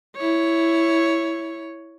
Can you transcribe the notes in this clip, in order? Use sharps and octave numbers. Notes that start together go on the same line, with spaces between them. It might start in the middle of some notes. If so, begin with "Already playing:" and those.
E4 C#5